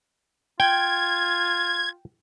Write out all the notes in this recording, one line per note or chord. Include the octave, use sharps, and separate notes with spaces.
F4 G5 G#6